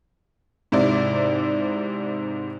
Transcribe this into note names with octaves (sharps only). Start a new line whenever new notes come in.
G#2 C3 E4 D5